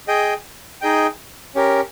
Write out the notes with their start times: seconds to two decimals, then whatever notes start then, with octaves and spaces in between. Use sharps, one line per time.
0.08 G#4 D#5 G5
0.81 D#4 G#4 D#5 G5
1.55 C#4 G4 A#4